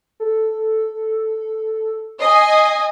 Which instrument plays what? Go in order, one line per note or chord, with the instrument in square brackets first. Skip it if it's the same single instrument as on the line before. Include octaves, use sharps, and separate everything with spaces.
[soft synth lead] A4
[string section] D#5 G#5 [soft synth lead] C7